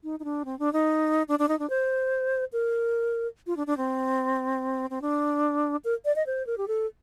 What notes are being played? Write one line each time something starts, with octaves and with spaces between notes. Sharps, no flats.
D#4
D#4
D4
C4
D4
D#4
D4
D4
D#4
D4
C5
A#4
F4
D4
D4
C4
C4
D4
A#4
D5
D#5
C5
A#4
G4
A4